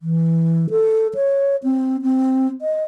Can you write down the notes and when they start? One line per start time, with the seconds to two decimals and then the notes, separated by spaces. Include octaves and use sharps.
0.01 E3
0.70 A4
1.15 C#5
1.64 C4
2.02 C4
2.62 D#5